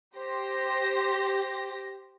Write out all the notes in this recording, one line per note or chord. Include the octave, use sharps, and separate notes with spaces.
G4 C5 A#6